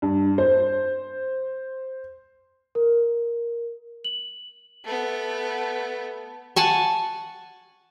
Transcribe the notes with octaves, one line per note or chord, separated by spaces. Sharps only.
G2
C5
A#4
F#7
A3 B3
F#5 G#5 A5 C#6